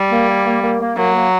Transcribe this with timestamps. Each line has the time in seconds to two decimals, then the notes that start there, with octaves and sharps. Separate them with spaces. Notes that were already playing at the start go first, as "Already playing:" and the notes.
Already playing: G3
0.11 A#3
0.28 A#3
0.46 A#3
0.62 A#3
0.80 A#3
0.96 F#3 A#3
1.13 A#3